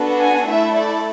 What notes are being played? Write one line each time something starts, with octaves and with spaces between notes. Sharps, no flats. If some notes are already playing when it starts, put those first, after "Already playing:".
Already playing: B3 D4 F#4 A4
G#5
A3 E4 A4 E5
D5